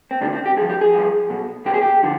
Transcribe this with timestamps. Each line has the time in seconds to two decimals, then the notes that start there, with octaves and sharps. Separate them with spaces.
0.11 C4
0.21 D2 C3 D#3 D4
0.33 C4
0.46 G4
0.57 G2 G#4
0.62 F3
0.69 G4
0.81 G#4
0.93 G2 F3
1.30 B1 B2
1.65 B1 B2 G4
1.74 G#4
1.81 G4
2.03 D3 F3